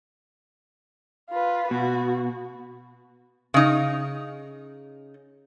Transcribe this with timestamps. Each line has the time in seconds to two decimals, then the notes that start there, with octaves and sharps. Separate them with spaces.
1.30 F4 B4
1.71 B2 F#4
3.54 C#3 D#4